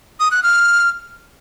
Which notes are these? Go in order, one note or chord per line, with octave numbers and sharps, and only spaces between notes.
D#6
F#6
F6